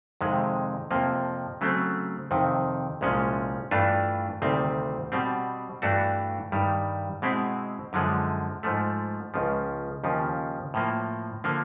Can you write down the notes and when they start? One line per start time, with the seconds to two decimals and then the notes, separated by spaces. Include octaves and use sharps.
0.21 F2 C3 D#3 G#3
0.91 F2 C3 F3 A#3
1.61 C#3 F#3 A3 C4
2.31 F2 C3 D#3
3.01 C2 A#2 F3 G#3 C#4
3.71 G2 E3 A3 D4 F4
4.42 D2 C3 D#3 G3 C4
5.12 B2 G3 C4
5.82 G2 E3 A3 D4 F#4
6.52 G2 D#3 G3
7.22 B2 G#3 C4 E4
7.93 F#2 D3 F3 G#3
8.63 G#2 F3 A3
9.34 C#2 C#3 F3
10.04 D#2 C#3 F3
10.74 A2 F3 A#3
11.44 D3 F3 A#3